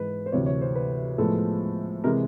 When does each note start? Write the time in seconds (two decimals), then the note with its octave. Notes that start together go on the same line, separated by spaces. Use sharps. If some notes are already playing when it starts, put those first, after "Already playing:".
Already playing: G#2 E3 G#3 B4
0.26 C5
0.32 D2 C3 E3 C#5
0.46 C#5
0.61 C5
0.76 B4
1.18 A2 F3 G#3 B3 A4
2.04 C3 E3 G#3 A#4